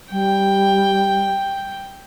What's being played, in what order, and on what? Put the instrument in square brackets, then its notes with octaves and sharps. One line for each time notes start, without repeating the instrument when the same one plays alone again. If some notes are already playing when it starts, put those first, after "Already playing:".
[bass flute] G3 [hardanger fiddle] G5